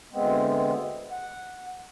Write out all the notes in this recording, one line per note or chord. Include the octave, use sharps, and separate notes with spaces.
D2 G#3 B3 C4
F#5